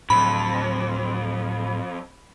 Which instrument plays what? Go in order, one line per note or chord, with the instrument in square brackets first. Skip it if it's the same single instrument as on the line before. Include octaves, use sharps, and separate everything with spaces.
[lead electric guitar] F2 [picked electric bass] A2 F#3 [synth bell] B5